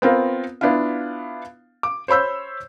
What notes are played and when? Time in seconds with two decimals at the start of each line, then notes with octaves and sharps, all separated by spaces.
0.02 B3 C4 F4 A#4
0.61 B3 D4 E4 F4 F5
1.83 D6
2.08 C5 C#5 B5 E6 G6